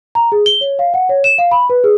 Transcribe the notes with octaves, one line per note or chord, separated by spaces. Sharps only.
A#5
G#4
G7
C#5
F5
F#5
C#5
E7
F5
B5
B4
G#4